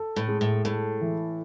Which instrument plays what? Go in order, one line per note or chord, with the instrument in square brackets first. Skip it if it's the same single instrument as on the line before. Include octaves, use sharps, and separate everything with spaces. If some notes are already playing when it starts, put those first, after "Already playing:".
Already playing: [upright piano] A4
[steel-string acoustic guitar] A2
[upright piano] G#3
[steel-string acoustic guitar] A2
[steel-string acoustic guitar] A2 [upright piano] A4
[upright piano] E3